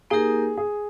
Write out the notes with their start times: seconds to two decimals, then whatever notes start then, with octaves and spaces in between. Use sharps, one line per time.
0.10 A#3 D#4 G4 G#4 A#4
0.57 G#4